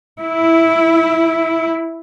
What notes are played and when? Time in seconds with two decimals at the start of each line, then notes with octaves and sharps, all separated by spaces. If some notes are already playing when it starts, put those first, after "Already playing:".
0.20 E4